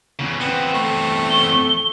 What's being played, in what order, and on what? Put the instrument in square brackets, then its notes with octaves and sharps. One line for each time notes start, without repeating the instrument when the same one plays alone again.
[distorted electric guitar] E2 C#3
[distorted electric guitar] E2 C4 [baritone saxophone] B3
[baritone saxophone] A3
[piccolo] G7